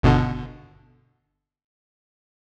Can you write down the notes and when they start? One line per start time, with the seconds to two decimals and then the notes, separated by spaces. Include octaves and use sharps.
0.03 G1 B2 D3